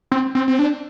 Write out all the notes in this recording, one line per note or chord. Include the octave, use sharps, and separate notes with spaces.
C4
C4
C4
D4